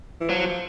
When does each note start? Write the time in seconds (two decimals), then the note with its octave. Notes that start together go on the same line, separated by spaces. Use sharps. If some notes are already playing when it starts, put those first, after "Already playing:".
0.21 E3
0.30 F3 F#3